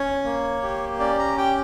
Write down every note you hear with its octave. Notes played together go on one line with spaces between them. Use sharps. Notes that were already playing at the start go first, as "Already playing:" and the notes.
Already playing: C#4 C#5
A#3
G4
C#4 D5
A#5
G4 G5